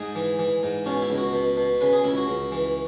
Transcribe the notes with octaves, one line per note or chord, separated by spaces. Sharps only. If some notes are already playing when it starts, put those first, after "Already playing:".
Already playing: G#2 G#4
E3
E3
G#2
B2 C#4
E4
C#2
F#4
B2
B2
C#3 B4
G#4
C#2 E4
F#4
C#2
E3